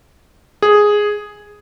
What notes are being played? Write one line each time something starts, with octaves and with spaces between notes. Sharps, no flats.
G#4